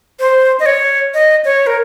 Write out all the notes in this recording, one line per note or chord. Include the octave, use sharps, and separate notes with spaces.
C5
D#5
C#5
D#5
C#5
A#4